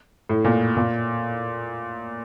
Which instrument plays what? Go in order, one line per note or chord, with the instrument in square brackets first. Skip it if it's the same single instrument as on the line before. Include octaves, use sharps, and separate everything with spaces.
[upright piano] A2
A#2
A#2